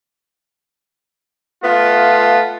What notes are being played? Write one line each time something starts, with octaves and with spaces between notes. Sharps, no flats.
A3 B3 F4